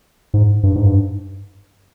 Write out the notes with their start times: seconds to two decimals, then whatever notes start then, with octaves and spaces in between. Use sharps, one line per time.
0.34 G#2
0.63 G2
0.76 G#2
0.85 G2